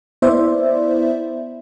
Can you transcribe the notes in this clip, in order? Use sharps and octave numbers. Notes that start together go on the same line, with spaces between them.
B3 E4 C5 D5 E5